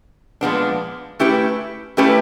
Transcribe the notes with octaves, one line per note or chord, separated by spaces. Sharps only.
A#2 F3 G#3 B3 D4
A3 C#4 E4 G4 B4
A3 C#4 E4 G4 B4